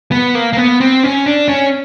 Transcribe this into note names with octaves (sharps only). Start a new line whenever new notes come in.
B3
A#3
A#3
B3
C4
C#4
D4
C#4